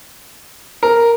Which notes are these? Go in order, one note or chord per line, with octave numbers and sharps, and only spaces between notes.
A#4